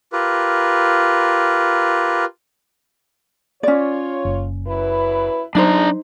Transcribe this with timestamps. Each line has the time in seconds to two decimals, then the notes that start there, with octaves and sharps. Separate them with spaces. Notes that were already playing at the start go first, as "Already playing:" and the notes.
0.12 F4 G4 A#4 B4
3.63 C#4 F4 C#5 D5
4.25 F#1
4.66 F#2 E4 B4
5.55 F#3 G#3 D4 D#4 C5 D5 A#5